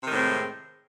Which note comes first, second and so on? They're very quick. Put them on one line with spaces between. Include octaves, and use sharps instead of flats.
C3 D#3 A2 C4 G#3